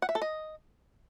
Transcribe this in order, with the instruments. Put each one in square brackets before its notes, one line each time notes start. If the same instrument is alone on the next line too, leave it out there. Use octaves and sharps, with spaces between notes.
[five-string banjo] F#5
E5
A4
D#5